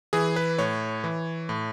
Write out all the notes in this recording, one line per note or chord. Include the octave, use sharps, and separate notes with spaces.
E3 G#4
B4
A2 C#5
E3
A2